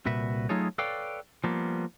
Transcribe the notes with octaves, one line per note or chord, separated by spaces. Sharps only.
C2 A#2 F#4 B4 E5
F#3 A3 D#4 F4 G#4 C#5
A4 B4 C#5 D5 F5 G5
F3 G3 A#3 B3